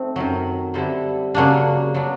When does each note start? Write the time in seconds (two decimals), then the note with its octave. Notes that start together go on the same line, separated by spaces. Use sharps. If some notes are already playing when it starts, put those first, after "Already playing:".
Already playing: A3 C4 D#4
0.16 F#2 D#3 F#3
0.74 D3 G3 C4 E4 A4
1.34 C#3 F#3 A#3 D4
1.94 F#3 B3 D4